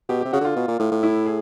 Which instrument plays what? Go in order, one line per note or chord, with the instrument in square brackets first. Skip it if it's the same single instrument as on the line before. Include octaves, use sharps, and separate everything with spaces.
[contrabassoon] B2 [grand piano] G4
[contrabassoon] C3 [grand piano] G4
[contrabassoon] C#3 [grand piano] F#4
[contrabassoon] D3 [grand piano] F4
[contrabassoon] B2
A#2
A2
A2
[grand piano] E4
G#4